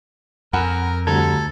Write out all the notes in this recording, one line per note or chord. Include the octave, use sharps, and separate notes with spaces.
F2 A#4 F#5 G#5 B5
D2 D3 G3 A4 A#5 G#6